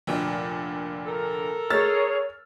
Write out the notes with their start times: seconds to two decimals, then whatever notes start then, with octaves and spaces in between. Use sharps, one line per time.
0.07 F1 A#2 D3
1.06 A4 A#4
1.70 G#4 C#5 E6 F6 A6